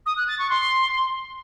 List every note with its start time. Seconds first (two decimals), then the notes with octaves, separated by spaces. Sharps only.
0.06 D#6
0.17 F#6
0.27 A6
0.38 C#6
0.49 C6